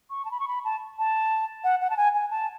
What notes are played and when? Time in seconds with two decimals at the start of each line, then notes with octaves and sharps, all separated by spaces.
0.10 C#6
0.25 A5
0.31 B5
0.40 C#6
0.48 B5
0.65 A5
0.99 A5
1.64 F#5
1.81 F#5
1.90 A5
1.97 G#5
2.14 G#5
2.31 A5